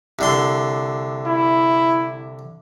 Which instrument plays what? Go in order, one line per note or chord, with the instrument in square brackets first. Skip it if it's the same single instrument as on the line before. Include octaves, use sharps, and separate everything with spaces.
[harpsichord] C2 D3 C6
[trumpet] E4